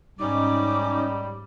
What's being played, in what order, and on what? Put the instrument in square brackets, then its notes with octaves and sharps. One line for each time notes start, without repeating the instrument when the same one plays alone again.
[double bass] G#2 [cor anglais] G3 [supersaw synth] C#4 D#4 [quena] D6